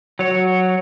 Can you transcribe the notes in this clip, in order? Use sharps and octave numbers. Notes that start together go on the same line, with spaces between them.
F#3 C#5